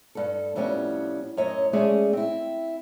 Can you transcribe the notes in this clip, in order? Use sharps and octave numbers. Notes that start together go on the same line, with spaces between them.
G2 A4
F2 A2 G3 B3 C#4
F#2 A2 C#5 D#5
G#3 A3 C#4 G#4 D5
C4 E4